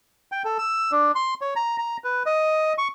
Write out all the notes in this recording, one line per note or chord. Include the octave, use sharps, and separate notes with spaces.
G5
A4
E6
D4
C6
C#5
A#5
A#5
B4
D#5
C#6